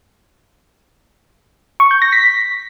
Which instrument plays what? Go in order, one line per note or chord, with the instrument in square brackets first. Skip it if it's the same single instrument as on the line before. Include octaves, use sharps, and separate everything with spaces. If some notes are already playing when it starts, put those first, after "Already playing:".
[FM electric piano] C#6
G6
A#6
B6